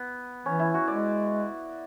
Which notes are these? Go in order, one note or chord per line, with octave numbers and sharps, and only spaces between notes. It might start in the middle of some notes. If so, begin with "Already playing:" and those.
Already playing: B3
E3 C#4
E4
F#4
G#3 D5